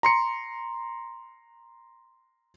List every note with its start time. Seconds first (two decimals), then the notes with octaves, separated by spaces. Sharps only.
0.03 A#5 C6 C#7